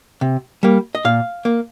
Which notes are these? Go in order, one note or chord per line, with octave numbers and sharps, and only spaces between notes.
C3
G3 A#3
D#5
A#2 F5
A#3